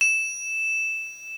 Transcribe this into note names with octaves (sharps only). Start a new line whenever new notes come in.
E7